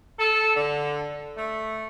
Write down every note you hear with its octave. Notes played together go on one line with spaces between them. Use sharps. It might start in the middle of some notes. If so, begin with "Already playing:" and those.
A4
D3
A3